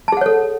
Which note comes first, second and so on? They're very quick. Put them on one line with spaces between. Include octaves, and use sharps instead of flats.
A5 G#4 F#5 C#5 A4